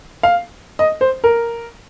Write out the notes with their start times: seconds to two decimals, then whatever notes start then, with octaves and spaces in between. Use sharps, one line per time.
0.23 F5
0.79 D#5
1.01 C5
1.24 A#4